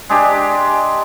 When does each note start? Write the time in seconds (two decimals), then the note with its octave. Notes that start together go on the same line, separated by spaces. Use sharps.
0.09 G#3 D4 G4